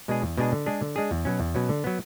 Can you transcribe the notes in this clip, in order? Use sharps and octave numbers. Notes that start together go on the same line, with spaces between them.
B2 G#3 D4 G#4
E2
B2 G#3 D4 G#4
D3
G#3 D4 G#4
D3
G#3 D4 G#4
E2
B2 F#3 C#4
E2
B2 F#3 C#4
D3
F#3 B3